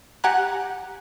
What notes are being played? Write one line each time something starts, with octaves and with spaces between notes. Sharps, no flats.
G4 F#5 G#5 A#5 F#6